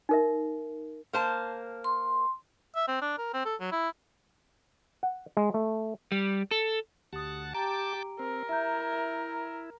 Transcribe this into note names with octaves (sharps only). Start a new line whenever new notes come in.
D#4 A#4 E5
A#3 C5 A5
C6
E5
C4
D4
A#4
C4
A4
F#3
E4
F#5
G#3
A3
G3
A4
D2 G4 F#5 A5 D#6
G4 G5 A5 A#5 D6 D7
C4 A#4
E4 E5 A#5 G6